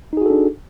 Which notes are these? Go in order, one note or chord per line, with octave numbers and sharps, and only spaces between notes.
D4 D#4 F#4 G#4 A4